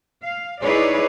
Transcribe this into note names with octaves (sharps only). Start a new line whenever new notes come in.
F5
D#4 E4 G#4 B4 C#5 D5